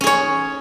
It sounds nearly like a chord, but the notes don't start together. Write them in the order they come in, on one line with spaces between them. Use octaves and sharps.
C#4 G#4 C#5